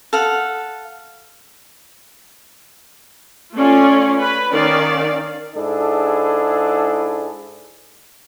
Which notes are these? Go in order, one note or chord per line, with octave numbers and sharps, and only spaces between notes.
A4 F5 F#5
A3 C#4 F4 C#5 D5
B4 B5
D#3 C#4 D5 F5
G#2 D4 E4 G#4 A4